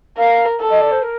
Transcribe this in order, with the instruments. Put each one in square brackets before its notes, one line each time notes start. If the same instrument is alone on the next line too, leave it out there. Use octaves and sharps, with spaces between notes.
[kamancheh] A#4 [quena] F5
[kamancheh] A4
[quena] D#5
D5
C5
A#4